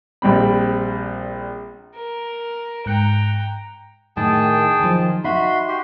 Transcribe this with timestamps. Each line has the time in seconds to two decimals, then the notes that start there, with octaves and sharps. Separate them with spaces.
0.22 A#1 G3 C4 B5
1.95 A#4
2.86 G#2 G5 A#5 F#6 C#7
4.17 A2 D#3 G#4 G5 A5
4.79 D#3 F3
5.24 D#4 F#4 E5 B5 C6
5.68 F#4 G4 C6